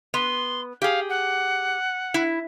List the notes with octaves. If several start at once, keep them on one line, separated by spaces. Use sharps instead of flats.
B3 C6
G4 G#4 F5
F#5
E4